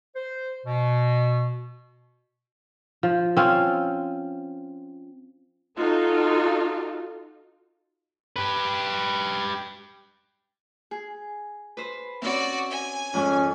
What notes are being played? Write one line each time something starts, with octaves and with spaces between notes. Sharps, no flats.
C5
B2
F3
C4 C#4 F4
D#4 F4 F#4 A4
G4 B4
G#4
B4 C5
C4 C#4 F#4 C#5 D5
G#5
F2 G#2 C#4